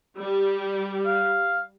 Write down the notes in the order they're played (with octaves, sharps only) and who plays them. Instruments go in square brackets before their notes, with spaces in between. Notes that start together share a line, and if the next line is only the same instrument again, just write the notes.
[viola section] G3
[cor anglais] F5